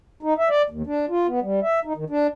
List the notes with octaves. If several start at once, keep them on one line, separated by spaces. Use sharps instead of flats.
D#4
E5
D5
D#2
D4
F4
B3
G3
E5
D#4
D#3
D4